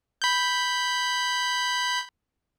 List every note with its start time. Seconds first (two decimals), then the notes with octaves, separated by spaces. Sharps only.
0.22 B5 G6